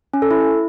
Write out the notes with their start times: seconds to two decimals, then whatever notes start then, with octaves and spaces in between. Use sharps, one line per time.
0.13 C#4
0.22 A4
0.31 E4